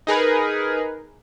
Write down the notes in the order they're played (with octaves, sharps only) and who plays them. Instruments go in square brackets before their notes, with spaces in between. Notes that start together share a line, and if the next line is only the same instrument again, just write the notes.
[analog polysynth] D#4 G#4 A#4 B4